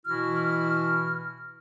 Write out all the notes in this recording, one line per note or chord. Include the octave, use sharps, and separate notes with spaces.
B2 E3 E4 F#4 F6